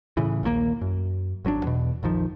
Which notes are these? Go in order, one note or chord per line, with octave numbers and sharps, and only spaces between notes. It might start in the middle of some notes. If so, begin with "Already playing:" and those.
A2 C#3 E3
A#1 D#2 C#3 A#3
F#2
G#1 F#3 C#4 D4
E2 B2
A#1 F2 D#3 F3